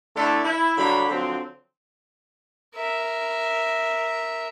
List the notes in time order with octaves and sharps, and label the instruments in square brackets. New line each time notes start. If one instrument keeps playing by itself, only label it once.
[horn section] D3 A3 D4 E4 A4
E4
D3 F#3 G3 A#3 B5
D3 F3 F#3 C4
[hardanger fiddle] A#4 E5